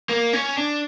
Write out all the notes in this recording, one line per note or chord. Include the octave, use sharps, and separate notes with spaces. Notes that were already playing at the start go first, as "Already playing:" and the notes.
A#3
C#4
D4